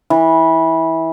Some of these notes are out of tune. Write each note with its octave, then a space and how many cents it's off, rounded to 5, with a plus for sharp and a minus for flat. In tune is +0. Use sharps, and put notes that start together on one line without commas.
E3 -20